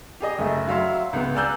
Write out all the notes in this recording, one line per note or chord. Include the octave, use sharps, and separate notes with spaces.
G4 G#4 D#5
F#1 A3 E5
F#3 E5 F5 C6
C#2 B3
D5 G#5 A#5 E6 F#6 G6